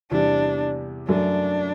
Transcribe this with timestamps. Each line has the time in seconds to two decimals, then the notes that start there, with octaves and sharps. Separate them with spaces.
0.11 E2 C3 G3 D4
1.08 F#2 F#3 A3 D4